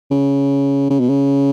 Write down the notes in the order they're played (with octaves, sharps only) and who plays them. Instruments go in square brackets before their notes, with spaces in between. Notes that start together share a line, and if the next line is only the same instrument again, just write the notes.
[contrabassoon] C#3
C#3
B2
C#3